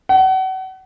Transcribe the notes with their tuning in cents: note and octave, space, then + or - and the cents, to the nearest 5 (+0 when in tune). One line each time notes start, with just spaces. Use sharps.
F#5 +35